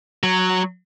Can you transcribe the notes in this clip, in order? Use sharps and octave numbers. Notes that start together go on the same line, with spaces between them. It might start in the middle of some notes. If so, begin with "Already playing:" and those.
F#3